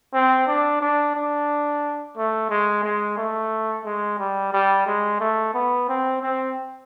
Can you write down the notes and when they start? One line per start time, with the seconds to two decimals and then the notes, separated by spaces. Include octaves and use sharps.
0.14 C4
0.47 D4
0.81 D4
1.15 D4
2.17 A3
2.50 G#3
2.83 G#3
3.17 A3
3.85 G#3
4.19 G3
4.53 G3
4.87 G#3
5.20 A3
5.54 B3
5.88 C4
6.22 C4